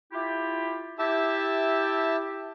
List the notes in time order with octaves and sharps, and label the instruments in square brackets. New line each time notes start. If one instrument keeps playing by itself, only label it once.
[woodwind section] E4 F4 G4
[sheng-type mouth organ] E4 E5 A5 [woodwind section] G4